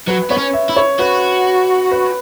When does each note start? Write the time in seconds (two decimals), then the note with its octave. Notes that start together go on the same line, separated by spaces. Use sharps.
0.07 F#3 B4
0.30 B3 C#5
0.38 C#4
0.53 E5
0.69 E4
0.76 C#5
0.99 F#4 B4
1.91 B4